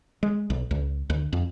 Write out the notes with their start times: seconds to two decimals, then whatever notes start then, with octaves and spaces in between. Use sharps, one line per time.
0.23 G#3
0.50 B1
0.71 C#2
1.10 D2
1.33 F2